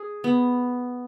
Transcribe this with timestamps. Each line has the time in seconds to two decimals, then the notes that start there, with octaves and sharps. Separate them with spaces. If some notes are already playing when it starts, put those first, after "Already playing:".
Already playing: G#4
0.24 B3